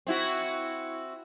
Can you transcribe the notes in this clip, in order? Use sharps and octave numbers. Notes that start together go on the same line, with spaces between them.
C4 E4 F#4